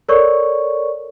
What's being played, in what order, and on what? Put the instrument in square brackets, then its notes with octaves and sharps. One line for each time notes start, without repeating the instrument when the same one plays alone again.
[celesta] A4 A#4 C#5 D5 C#6